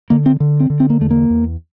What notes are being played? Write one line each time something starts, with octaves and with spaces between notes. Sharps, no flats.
D3 A#3
C4
D3
C4
D3
C4
A#3
E2 A3
A#3
E2